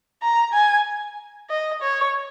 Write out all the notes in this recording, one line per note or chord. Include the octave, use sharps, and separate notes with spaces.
A#5
G#5
D#5
C#5